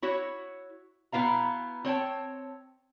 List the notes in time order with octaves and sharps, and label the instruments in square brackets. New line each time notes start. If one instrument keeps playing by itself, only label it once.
[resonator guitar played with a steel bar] E4 F#4 C#5
B2 B3 E4 F5 A#5
C4 C#5 G5 A5